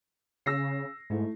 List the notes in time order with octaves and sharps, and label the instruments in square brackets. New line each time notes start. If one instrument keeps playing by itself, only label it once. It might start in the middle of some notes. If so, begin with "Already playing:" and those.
[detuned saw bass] C#3 [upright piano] E6 A#6 C7
[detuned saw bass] G#2 [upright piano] A3 E4